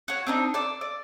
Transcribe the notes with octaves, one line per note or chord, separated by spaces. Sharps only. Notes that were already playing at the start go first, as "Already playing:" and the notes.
F#4 C#5
C4 D4 D#4
D5 D6 E6
D5